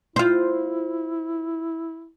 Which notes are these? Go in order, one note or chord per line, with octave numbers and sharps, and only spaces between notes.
E4 F4 C5